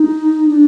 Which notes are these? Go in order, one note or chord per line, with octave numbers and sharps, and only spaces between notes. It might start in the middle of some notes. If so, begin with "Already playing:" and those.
Already playing: D#4
D4